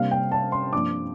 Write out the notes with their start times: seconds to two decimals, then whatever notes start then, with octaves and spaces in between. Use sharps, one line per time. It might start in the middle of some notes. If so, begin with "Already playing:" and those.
Already playing: C3 G3 A#3 D4 F5
0.11 G5
0.32 A5
0.52 C6
0.73 G2 F3 A#3 D4 D6